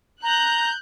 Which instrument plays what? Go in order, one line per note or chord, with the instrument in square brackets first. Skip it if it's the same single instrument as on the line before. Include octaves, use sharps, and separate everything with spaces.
[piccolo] A#5 [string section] F#6 G6